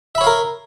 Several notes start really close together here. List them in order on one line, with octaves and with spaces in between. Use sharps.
E5 B5 C#5 F5 A#4